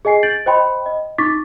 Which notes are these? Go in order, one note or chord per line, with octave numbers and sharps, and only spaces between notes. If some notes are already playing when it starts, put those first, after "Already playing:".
G#4 D#5 G#5 C7
G6 A6 D7 F#7
C5 D#5 G5 B5 C6
D#5
D#4 C#6 D6 A6 B6